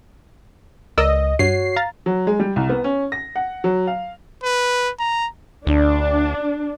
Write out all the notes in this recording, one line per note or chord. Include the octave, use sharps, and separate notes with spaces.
C#2 A#4 D5 D#5 E6
G2 F#4 C#5 C7
F5 A#5 A6
F#3
G#3
G3
C2
B3
C#4
A#6
F#5
F#3
F5
B4
A#5
D2 D4